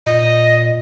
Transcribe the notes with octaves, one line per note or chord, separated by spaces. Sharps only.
A#2 D#5